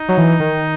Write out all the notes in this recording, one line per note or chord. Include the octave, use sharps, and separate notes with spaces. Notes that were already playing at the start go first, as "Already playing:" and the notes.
Already playing: D#4
F#3
E3
D#3